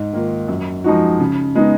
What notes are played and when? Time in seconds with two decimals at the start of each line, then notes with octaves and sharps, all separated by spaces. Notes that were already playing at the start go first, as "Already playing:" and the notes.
Already playing: G#2
0.13 D#3 A#3 F4
0.48 F#2
0.84 F3 G#3 D#4 F#4
1.20 C#3
1.55 G#3 B3 D#4